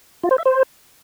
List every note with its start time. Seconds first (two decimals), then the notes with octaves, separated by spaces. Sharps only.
0.23 F4
0.31 C5
0.38 E5
0.45 C5